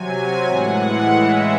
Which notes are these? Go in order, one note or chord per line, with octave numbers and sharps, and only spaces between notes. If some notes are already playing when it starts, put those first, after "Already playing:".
Already playing: C3 F#3 G#5
A2 E3 G#3 F#5
C#3 E3 G#3 E5